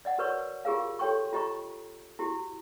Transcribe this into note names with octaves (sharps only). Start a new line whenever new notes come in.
D5 D#5 F#5
F#4 A#4 B4 C#5 D5 C#6
F4 G4 G#4 A#4 F5
G4 A4 C#5 G5 C6 C#6
F4 G4 D#5 A#5 C#6
E4 F#4 G4